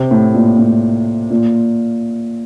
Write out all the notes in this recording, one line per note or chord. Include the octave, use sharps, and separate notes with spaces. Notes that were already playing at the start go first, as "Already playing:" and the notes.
Already playing: C3
A2
A#2
A2
A#2